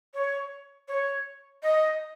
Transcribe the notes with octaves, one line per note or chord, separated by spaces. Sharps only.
C#5
C#5
D#5